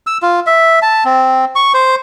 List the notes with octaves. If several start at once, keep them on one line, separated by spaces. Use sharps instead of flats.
E6
F4
E5
A5
C4
C#6
C5